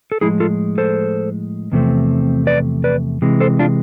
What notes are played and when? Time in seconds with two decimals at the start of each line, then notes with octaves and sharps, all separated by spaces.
0.12 A4
0.21 A2 F3 G#3 E4 G#4
0.40 F4 A4
0.78 A4 C5
1.72 E2 C3 F3 A3 C4
2.47 B4 D5
2.84 B4 D5
3.22 C3 E3 G#3
3.40 A4 C5
3.59 D4 F4